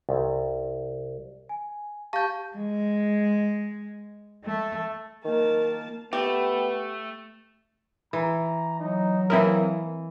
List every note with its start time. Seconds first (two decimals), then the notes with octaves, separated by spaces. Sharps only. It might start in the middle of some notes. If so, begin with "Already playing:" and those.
0.09 C2
1.49 G#5
2.13 G4 F5 A5 C#6 G6
2.56 G#3
4.44 A3
5.25 D#3 A#3 A5
6.13 A3 B3 G4
8.13 E3 A#5
8.80 F#3 D#4
9.30 E3 A#3 C4 E4 A#4 D#5